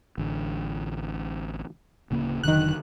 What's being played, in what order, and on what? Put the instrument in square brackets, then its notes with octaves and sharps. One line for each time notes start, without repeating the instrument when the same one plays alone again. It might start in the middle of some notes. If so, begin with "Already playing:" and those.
[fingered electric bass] A1 D3
D1 C#3 A#3
[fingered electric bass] F1 D3 F#3 [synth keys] D#3 F#6